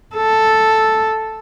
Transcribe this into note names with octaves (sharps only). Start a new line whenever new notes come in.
A4